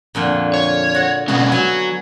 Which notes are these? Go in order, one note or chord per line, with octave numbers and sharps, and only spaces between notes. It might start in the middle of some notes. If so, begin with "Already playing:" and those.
F2 A#2 D3
C#5
F#4 F#5
B2 G#3 B3 C#4 F#4
F#3 G#5